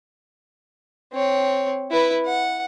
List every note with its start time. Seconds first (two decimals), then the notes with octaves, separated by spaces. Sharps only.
1.13 C4 C#5
1.91 E4 B4
2.26 F#5